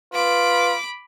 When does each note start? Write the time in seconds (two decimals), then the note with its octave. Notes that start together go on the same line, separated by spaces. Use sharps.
0.14 F4 B4 B5 D6